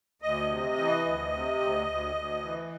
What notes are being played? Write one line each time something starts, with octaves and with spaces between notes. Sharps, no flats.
D2 D#5
C3
E3
D2
C3
D2
D2
D2
E3